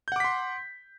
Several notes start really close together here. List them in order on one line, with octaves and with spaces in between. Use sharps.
G6 F#5 D6 B6 C6